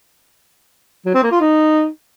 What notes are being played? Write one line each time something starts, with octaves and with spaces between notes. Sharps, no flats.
F#3
C4
A#3
F4
D#4